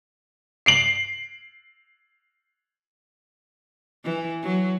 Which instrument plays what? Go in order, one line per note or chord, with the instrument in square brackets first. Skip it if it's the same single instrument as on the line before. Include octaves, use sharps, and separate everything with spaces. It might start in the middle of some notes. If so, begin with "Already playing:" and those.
[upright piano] C7 D7 F#7
[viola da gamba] E3
F#3